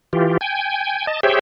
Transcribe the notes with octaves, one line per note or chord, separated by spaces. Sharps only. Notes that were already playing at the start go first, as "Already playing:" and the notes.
E3 F4 G4
G5 G#5
D#5 A5
G4 G#4 C5 C#5 E5 G5